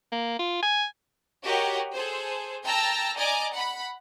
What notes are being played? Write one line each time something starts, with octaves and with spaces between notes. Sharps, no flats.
A#3
F4
G#5
F#4 G4 A#4 C#5 D#5
G#4 A4 C5
G5 A5 A#5 E6 A#6
D5 D#5 G#5 A#5 D6
F#5 B5